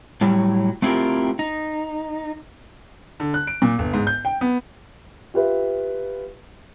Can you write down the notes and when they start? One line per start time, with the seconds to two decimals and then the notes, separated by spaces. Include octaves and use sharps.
0.21 A2 F#3 G3 E4
0.82 A3 C4 E4 F4 G4 A#4
1.39 D#4
3.20 D3
3.34 F#6
3.47 D7
3.62 A#2
3.79 G1
3.93 G#2
4.07 G6
4.25 G5
4.41 B3
5.34 F4 G4 B4 E5